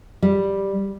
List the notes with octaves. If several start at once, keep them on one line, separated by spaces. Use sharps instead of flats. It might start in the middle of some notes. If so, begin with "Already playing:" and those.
G3